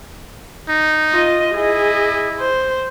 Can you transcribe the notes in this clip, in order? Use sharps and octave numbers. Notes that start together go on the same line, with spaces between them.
D#4
F4 D#5
E4 G#4 D#5
C5